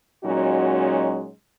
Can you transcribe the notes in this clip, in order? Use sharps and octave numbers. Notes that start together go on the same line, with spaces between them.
A#2 F#3 G#3 C#4 D#4 F#4